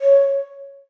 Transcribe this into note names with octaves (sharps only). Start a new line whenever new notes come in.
C#5